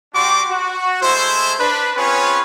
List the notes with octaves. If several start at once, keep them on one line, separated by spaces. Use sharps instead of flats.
G3 D4 F#4 G4 C6 D6
F#4
G#3 A3 E4 C5
D4 B4
C4 C#4 F4 G#4 B4 C#5